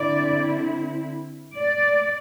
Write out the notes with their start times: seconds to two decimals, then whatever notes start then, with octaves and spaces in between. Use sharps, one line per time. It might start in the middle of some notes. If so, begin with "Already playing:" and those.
Already playing: D3 C4 E4 D5
1.59 D5